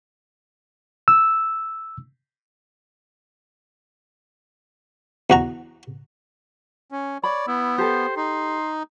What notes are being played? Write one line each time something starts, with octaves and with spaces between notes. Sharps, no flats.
E6
E2 F#4 A#5
C#4
C#5 D5 B5
B3 E4
G4 A4 C5
D#4 C6